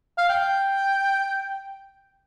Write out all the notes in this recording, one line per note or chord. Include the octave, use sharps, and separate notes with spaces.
F5
G5